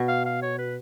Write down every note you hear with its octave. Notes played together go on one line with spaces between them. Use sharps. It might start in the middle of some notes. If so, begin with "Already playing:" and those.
Already playing: B2
F5
F5
C#5
B4